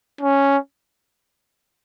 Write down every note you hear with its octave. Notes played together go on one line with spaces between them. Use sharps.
C#4